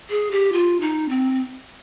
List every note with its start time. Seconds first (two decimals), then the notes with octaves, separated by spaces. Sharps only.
0.10 G#4
0.31 G4
0.53 F4
0.81 D#4
1.09 C4